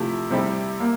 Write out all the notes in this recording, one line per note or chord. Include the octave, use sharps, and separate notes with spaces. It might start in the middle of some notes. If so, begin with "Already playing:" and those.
Already playing: C3 F3 A3 E4
C3 G3 C4 E4 G4
A#3